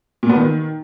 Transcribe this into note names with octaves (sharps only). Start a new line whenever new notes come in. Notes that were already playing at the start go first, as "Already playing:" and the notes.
A#2
B3
D#3